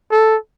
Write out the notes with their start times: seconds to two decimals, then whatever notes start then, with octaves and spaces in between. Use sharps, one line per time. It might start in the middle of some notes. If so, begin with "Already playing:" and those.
0.11 A4